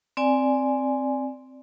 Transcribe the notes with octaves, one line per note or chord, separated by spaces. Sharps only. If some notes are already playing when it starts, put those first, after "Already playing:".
C4 D5 G#5